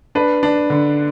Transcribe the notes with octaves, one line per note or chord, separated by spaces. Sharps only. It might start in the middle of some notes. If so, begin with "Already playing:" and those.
D4 B4
D4
D3